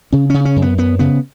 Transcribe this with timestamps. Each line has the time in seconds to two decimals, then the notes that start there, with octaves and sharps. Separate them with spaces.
0.12 C#3 C#4
0.30 C#3 C#4
0.45 C#4
0.56 F#2
0.62 B3
0.78 F#2 B3
0.99 C#3 B3